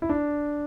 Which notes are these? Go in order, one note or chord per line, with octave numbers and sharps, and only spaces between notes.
E4
D4